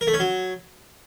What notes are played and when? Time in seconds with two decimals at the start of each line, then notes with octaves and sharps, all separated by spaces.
0.01 A#4
0.07 A3
0.14 C#4
0.20 F#3